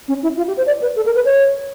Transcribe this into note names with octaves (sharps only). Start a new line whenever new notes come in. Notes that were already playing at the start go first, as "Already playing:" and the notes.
C#4
E4
F4
G4
C5
D5
B4
A4
A#4
B4
C#5